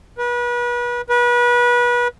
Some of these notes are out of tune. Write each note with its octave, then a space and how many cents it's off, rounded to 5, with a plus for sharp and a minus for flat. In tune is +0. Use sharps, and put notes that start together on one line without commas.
B4 -35
B4 -30